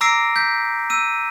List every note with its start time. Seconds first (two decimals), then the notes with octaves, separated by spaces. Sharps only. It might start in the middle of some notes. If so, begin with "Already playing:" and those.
0.01 A#5 D6 E6 A#6 C7 D7
0.36 G6 B6
0.90 E6 D#7